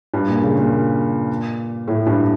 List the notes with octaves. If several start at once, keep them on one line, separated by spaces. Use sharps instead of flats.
G2
A#2
C#3
A#2
A2
G2